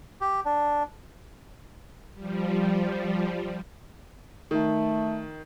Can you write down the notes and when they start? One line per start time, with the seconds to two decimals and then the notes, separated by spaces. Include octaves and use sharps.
0.21 G4
0.45 D4
2.14 F3 G3
4.51 D#3 A3